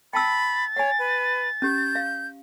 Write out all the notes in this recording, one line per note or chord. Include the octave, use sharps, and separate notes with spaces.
G5 A5 B5 E6 A6
C#5 F#5 G#5
B4
C#4 G4 G6
F5